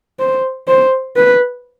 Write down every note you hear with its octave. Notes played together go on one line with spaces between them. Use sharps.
C5
C5
B4